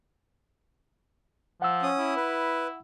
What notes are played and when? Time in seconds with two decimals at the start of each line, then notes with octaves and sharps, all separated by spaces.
1.62 F3 F#5 E6
1.83 C#4 D#6
1.98 E4
2.17 B4